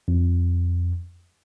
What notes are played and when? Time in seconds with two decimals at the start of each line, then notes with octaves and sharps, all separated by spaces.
0.08 F2